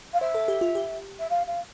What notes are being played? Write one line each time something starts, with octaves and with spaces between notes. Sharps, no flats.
F5
C5 E5
A4
G4
F4
G4
E5
F5
F5